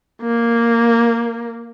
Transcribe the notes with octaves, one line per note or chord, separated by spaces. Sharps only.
A#3